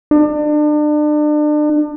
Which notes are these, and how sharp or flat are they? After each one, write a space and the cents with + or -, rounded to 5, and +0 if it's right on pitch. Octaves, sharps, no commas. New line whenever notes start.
D4 +35